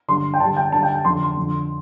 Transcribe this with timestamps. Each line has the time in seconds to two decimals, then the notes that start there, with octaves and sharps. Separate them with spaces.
0.08 G2 D3 C6
0.34 G5
0.40 G2 D3 A5
0.57 G5
0.72 G2 D3 A5
0.83 G5
0.94 G5
1.05 F2 D3 C6
1.23 C6
1.36 F2 D3